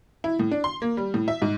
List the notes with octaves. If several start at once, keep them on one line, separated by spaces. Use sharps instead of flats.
E4
A2
D4
C6
A#3
G3
A2
E5
G#2